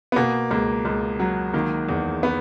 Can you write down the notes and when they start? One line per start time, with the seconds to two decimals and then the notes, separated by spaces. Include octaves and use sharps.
0.12 B3
0.16 B2 A#3
0.51 C#2 A#3
0.85 C#2
1.19 F#3
1.54 D#3 A#3
1.88 E2
2.23 B3